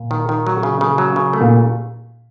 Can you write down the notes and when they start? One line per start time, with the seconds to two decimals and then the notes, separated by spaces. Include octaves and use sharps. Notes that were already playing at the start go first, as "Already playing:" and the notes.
Already playing: A#2
0.11 D#3
0.29 D#3
0.47 F#3
0.63 C#3
0.81 C#3
0.98 F#3
1.16 C#3
1.33 A3
1.40 A#2